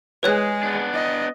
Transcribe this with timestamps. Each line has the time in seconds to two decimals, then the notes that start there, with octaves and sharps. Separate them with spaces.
0.23 G#3 G#4 B4 C#5 F#6
0.63 B3 D4
0.94 D#5